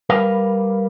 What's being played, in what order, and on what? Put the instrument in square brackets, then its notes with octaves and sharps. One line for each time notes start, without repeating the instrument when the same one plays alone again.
[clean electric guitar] G3 A#4 B4 F5